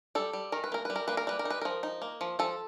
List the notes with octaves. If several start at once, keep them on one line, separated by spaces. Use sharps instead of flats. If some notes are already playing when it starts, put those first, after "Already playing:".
G3 A4
G3
D#3 A#4
B4
A#3 A#4
G3 B4
A#4
A#3 B4
A#4
G3 B4
A#4
D#4
B4
F3 A#4
D#4
A#3
F3
F3 A4